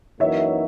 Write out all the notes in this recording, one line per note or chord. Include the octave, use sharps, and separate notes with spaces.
F#2 E3 A#3 D#4 F#4 C#5 E5